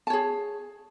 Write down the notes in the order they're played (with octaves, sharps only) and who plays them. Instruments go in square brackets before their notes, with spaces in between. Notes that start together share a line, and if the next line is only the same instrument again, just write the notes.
[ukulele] A5
C#5
G#4